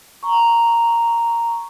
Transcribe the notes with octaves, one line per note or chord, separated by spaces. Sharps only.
A#5 C#6